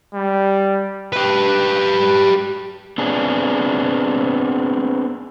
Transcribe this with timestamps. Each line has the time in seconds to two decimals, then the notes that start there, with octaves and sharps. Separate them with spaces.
0.14 G3
1.12 G4 B4
2.98 B3 C4 D4 G#4